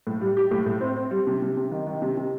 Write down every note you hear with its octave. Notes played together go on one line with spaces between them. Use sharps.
A2
G3
G4
A2
A2
C4
C4
G3
C3
C3
C3
D#3
D#3
C3
C3